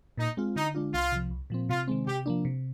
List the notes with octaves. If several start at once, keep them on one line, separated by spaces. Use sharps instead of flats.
A#2 D#4
G#3 C4 F4
D3 D#4
G#3 D4 F4
C2 F4
C3 F3
C2
A#2 F3 C4
C3 F4
D#3 G#3 C4
C3 G4
F3 A#3 D4
C3